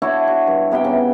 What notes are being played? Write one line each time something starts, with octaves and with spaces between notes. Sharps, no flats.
D4 E4 F#4 C#5
F#4
G2
C3 B3 G4 G5
C#3